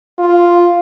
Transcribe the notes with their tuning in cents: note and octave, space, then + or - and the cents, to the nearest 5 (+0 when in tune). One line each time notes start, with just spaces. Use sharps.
F4 +0